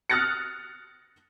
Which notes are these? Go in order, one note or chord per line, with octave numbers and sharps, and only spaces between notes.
D#6 F6 F#6 A6 A#6 C#7